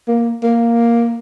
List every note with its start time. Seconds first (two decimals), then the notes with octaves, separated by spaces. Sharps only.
0.08 A#3
0.43 A#3